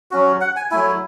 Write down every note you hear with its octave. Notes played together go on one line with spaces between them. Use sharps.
F#3 C#4 F#4
F#5
G#5
F#3 A3 E4 G#5